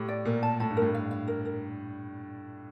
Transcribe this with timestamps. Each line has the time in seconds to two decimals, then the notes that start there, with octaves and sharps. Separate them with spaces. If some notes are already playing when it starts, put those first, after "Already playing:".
Already playing: A2 G4
0.08 D5
0.25 A#2 A#4
0.43 A5
0.60 A2 A5
0.71 G2
0.77 A2 A#4
0.94 F5
1.11 F5
1.28 A#4
1.45 A#4